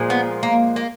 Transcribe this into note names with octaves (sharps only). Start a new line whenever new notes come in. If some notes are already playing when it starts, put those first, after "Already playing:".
Already playing: A#2 F3 G#3
B3
A#3
A#3